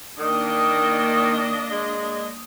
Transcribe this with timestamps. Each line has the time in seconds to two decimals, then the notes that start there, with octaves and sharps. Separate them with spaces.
0.19 D#3 A#3 D4 D#5
1.71 G#3